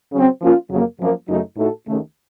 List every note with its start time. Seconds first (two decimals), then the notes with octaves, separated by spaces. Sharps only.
0.13 C#3 F#3 C4
0.41 F3 A#3 C#4 F4
0.70 F2 C#3 F#3 A#3
0.99 F#2 F3 A#3
1.28 F#2 C#3 F#3 A3 D#4
1.57 A2 A3 D#4 F#4 A4
1.86 D#2 C#3 A3